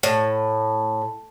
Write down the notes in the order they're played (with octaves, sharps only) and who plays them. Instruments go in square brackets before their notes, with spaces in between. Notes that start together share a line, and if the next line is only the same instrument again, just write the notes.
[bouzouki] A2